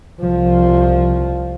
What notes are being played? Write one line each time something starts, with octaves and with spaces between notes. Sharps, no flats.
C2 F3